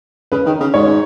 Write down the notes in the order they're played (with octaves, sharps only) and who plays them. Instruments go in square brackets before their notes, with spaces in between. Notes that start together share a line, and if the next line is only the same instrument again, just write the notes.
[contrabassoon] C#3 [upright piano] B4
[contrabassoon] D#3
C#3
[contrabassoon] G#2 [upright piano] C#5